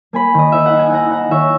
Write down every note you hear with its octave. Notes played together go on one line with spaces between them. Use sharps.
A#3 G#5 B5
D#3 D#5
D#4 E5
F#5
D#4
G#5
D#4 F#5 A#5
D#4 F#5 A#5
D#3 C#5 E5